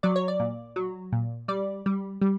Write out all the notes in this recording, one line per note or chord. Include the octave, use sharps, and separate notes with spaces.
F#3 D5
C#5
D5
A#2
F#3
A#2
G3 D5
G3
G3